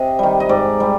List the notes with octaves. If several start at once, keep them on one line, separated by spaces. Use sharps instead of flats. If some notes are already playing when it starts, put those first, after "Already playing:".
Already playing: C3 D#5
D#3 G3
D#5
G#2 D5
G3